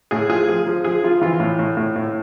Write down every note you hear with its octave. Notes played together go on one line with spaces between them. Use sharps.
A2 G#4
F3 G#4
F3 G#4
F3
F3 G#4
F3 F4
E3 F4
A2
A2
A2
A2